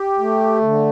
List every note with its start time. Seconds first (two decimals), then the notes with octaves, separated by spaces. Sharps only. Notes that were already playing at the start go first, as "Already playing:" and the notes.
Already playing: G4
0.19 A3
0.61 D3